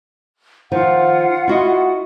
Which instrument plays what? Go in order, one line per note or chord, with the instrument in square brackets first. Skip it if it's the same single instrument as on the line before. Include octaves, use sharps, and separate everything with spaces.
[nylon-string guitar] D#3 F3 [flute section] F4 F#5
[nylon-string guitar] E4 F#4 D#5